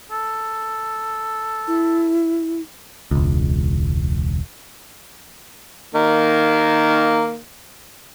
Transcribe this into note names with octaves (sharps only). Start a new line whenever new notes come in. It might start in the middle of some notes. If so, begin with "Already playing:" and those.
A4
E4
E1 C#2
D#3 A#3